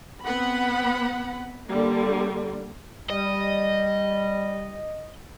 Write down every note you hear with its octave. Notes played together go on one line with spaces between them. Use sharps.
B3 C4 F#5 B5
D3 G3 A#3
G3 D#5